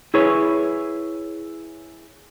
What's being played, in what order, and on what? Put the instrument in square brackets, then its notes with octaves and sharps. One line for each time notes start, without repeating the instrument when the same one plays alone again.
[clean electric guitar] E4 G#4 B4 C#5